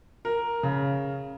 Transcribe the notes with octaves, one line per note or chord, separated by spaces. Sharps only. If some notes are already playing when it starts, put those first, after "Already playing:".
A#4
C#3